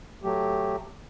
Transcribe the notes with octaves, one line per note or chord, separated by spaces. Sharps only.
F#3 A3 G4